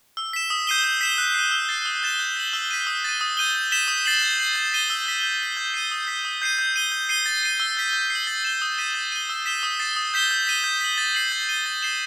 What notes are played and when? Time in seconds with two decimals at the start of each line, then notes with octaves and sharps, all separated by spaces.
0.17 E6
0.33 B6 E7
0.50 D#6
0.67 G6 C7 D#7 G7
0.84 G6
1.01 B6 E7 G7
1.18 F#6
1.34 C7 D#7
1.51 E6
1.69 A6 C7
1.86 D#6
2.03 F#6 A6 E7 G7
2.19 G6
2.37 B6 F#7
2.53 E6
2.71 B6 D#7
2.87 D#6
3.05 A6 D#7
3.21 D#6
3.37 G6 D#7 G7
3.55 G6
3.71 B6 E7 G7
3.88 D#6
4.06 A6 C7 F#7
4.22 G6
4.39 C7 F#7
4.56 G6
4.72 B6 D#7 G7
4.90 E6
5.06 G6 B6
5.23 G6
5.40 B6 F#7
5.57 G6
5.74 C7 D#7 G7
5.91 D#6
6.07 G6 B6
6.25 D#6
6.42 G6 C7 D#7
6.59 G6
6.76 D#7 G7
6.92 G6
7.09 C7 D#7 G7
7.26 A6
7.43 C7 D#7
7.60 E6
7.77 G6 B6
7.93 G6
8.10 C7
8.15 F#7
8.27 A6
8.45 E7 G7
8.62 D#6
8.78 G6 B6 D#7
8.95 A6
9.12 D#7 G7
9.29 E6
9.46 B6 E7 G7
9.63 D#6
9.79 A6 C7 E7
9.96 D#6
10.14 G6 B6 E7 G7
10.31 G6
10.47 B6 D#7 G7
10.64 G6
10.81 B6 F#7
10.98 A6
11.15 C7 F#7
11.32 G6
11.49 D#7 G7
11.66 A6
11.82 C7 E7 G7